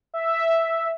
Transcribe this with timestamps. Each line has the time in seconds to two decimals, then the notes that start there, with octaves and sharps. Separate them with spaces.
0.14 E5